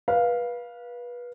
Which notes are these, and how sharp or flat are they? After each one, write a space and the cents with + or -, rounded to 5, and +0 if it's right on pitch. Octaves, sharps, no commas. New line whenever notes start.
B4 -25 F5 +0